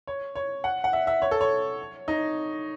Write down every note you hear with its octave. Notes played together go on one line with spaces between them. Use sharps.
C#5
C#5
F#5
F#5
E5
E5
C#5
A4
C#5
D#4